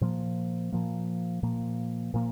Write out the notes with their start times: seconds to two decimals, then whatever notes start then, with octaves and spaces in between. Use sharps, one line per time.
0.01 A#2 F3 A#3
0.72 A#2 F3 A#3
1.43 A#2 F3 A#3
2.14 A#2 F3 A#3